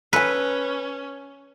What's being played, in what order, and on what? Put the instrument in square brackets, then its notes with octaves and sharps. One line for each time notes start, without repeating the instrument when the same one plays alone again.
[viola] C#4 [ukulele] A4 G#5 [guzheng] B4